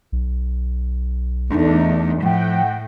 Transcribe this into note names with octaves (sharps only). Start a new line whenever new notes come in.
B1
E2 A3 D4 D#4
A2 F3 F#5 G5